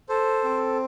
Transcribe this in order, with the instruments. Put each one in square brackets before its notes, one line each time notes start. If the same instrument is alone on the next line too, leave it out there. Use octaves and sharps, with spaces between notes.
[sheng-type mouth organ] A4 C5
C4